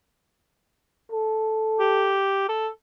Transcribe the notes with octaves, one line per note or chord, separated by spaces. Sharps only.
A4
G4
A4